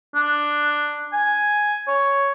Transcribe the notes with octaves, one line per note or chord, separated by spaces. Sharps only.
D4
G#5
C#5